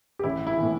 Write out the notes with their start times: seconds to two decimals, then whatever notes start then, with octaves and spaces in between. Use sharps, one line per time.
0.19 G4
0.24 A1 E4
0.47 E4
0.58 A2 E3